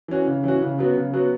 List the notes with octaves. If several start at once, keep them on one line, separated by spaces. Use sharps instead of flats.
E3 C#4 F#4
C#3
E3 C#4 F#4
C#3
F#3 B3 F#4
C#3
F#3 B3 F#4